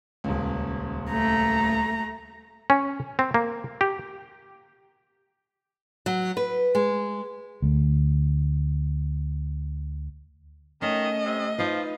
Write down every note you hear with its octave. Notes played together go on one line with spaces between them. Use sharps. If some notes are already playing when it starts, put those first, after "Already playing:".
D#1 C#2
A3 A#5
C#4
C4
A#3
G4
F#3
B4
G#3
D2 A3
D#3 A3 C#4 D#5
C3
F3 D#4 F4 B4